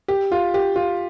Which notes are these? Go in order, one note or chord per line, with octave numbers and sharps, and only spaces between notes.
G4
F4
G4
F4